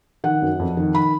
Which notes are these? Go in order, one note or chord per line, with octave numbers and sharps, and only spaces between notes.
D#3 F#5
F#2
F2
D#3
B5